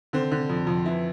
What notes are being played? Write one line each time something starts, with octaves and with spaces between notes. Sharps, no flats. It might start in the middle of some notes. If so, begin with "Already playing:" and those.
D3 C4
D3
F2
F2
E3 E4